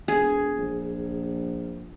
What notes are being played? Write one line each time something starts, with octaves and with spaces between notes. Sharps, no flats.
E1 G#4
A#1